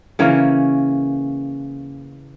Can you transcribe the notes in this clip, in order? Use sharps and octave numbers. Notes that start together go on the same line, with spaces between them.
C#3 E3 A#3 C#4